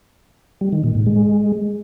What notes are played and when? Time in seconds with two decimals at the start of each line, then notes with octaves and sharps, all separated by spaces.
0.61 G3
0.72 D#3
0.84 A#2
0.95 G#2
1.06 G#3